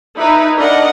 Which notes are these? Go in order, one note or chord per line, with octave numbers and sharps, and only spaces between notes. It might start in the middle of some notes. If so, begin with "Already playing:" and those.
D#4 E4 B4
D4 A#4 D#5 F#5